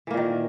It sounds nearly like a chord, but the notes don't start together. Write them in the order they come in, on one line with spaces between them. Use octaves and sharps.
E3 A#3 A#2 D#3